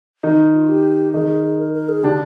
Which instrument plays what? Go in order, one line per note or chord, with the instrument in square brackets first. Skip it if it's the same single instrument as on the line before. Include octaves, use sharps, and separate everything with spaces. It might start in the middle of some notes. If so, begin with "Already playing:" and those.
[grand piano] D#3 D#4
[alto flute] F4
G4
[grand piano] D#3 D#4 [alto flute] G#4
[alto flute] G#4
G#4
A#4
A#4
G#4
[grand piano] D3 D4 [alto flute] G4